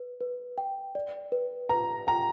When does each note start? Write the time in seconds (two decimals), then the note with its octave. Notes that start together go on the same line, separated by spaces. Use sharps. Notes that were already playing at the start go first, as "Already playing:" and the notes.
Already playing: B4
0.21 B4
0.58 G5
0.95 D5
1.32 B4
1.69 B4 A#5
2.07 G5 A#5